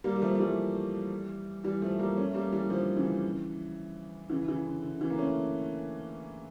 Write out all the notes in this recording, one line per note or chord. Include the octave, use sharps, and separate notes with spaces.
G3 A#3
G3
F3 A3
A3
E3 G3
E3 G3
F3 A3
G3 A#3
A3 C#4
G3 A#3
E3 G3
D3 F3
C#3 E3
C#3 E3
C#3 E3
D3
D3
C#3 E3
A#3
A3 C#4